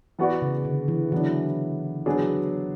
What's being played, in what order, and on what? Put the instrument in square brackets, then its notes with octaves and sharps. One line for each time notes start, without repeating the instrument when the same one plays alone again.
[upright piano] E3 B3 F#4 B4 D5
[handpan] C#3
D3
E3
[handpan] E3 [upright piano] F#3 B3 D4
[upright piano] F#3 B3 D4 G#4